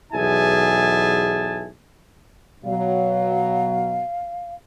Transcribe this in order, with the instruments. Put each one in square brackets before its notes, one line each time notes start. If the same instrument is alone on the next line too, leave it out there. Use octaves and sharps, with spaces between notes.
[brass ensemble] B1 E2 E4 G#4 G#5 A5
[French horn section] B2 F#3 [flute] F5